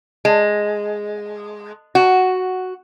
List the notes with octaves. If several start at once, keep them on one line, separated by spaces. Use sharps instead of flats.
G#3
F#4